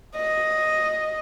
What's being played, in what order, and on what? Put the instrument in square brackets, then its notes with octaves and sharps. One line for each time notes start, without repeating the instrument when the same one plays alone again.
[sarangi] D#5